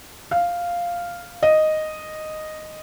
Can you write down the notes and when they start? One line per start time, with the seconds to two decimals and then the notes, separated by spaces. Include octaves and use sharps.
0.31 F5
1.43 D#5